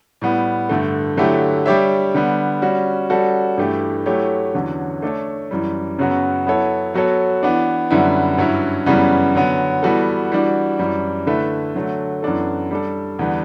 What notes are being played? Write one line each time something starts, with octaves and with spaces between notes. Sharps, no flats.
A2 G3 B3
G2 D3 A3
D3 F#3 A3 E4 G4
G3 D4 G4 C#5 E5
D3 G3 B3
G3 C#4 F#4
G3 C#4 F#4 A4
G2 E3 A3 E4 G4
F#3 A3 E4 G4 C#5
E2 D3 F#3 C#4
A3 D4 A4 C#5
F#2 E3 G3
F#2 C#3 F#3 B3 F#4
F#3 B3 E4 A4 C#5
F#3 B3 F#4 A4 C#5
E3 B3 D4
F#2 D3 G3 B3 E4
G2 F#3 C#4 E4
F#2 C#3 E3 G3 B3
D3 F#3 B3
E3 G3 B3 F#4 A4
E3 G3 D4 F#4
F#2 E3 G3
D3 A3 E4 B4 E5
D3 F#3 A3
F#2 E3 B3 D4 A4
G3 D4 A4
E2 D3 G3 B3